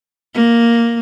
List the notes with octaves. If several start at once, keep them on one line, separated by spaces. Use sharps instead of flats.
A#3